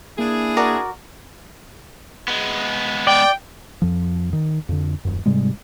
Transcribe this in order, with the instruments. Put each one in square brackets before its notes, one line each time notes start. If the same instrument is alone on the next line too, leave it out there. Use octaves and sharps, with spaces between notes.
[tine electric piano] A#3 [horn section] D4 E4 G#4
[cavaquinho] F#4 A#4 D5
[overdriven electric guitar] G#3 B3
[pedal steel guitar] D5 [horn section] G5
[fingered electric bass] F2 F3
D#3
F2 D3
D#1 F#2
G#2 C3 G3 G#3